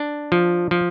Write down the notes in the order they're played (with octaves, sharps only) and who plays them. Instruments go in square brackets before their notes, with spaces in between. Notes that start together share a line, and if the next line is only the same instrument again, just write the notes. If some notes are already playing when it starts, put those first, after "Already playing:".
Already playing: [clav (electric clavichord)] D4
F3
F3